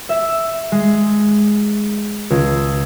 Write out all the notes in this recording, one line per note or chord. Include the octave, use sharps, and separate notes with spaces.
E5
G#3
C#2